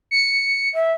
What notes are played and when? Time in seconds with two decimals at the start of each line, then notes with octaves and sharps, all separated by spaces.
0.11 C#7
0.74 E5